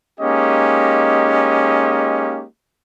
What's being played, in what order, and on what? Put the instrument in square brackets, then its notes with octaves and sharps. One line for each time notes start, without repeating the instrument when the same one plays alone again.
[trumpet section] G#3 A#3 C#4 D#4 G4 D#5